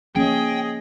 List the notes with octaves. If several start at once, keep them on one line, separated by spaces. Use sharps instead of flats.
F3 A#3 C#4 G#4 D#5 G5